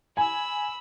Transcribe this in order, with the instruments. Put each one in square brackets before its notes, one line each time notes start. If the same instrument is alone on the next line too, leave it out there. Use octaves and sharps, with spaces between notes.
[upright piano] G#5 [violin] B5 E6